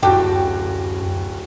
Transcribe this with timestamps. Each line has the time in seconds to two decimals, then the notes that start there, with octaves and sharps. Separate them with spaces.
0.03 D1 F#2 F#4 G4 A4 G5